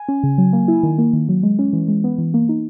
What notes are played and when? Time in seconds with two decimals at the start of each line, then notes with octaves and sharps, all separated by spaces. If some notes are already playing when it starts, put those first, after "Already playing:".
Already playing: G#5
0.08 C#4
0.23 C#3
0.38 F#3
0.53 A#3
0.68 E4
0.83 D#3
0.98 A#3
1.13 D#3
1.29 F#3
1.43 G#3
1.59 C#4
1.73 E3
1.88 G#3
2.04 B3
2.18 E3
2.34 A#3
2.49 D#4